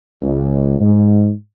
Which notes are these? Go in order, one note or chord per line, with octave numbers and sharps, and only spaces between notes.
C#2
G#2